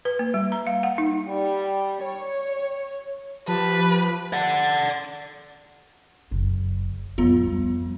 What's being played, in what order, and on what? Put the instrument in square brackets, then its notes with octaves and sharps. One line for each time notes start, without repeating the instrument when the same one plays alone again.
[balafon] B4
A#3
G3
A#5
F5
F#5
D#4
[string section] G3
C#5
[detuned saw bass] F3 [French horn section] G4 [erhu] B4 [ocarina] A5
[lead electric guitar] D5 F#5
[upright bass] F#1 C#3
[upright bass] D1 F2 [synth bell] G3 B3 F4
[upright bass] F2